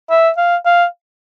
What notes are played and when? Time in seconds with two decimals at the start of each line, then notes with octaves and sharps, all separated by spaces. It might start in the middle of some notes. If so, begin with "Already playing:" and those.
0.10 E5
0.37 F5
0.66 F5